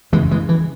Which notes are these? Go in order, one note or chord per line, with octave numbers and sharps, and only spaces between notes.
F#2 C#3 E3 G#3
E3 G#3
E3